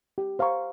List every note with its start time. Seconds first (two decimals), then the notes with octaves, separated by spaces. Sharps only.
0.18 G4
0.39 C5 F5 A#5 C#6